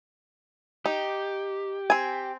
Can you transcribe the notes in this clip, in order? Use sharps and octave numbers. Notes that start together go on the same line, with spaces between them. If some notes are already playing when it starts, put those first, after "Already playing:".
D#4 G4
C4 G#5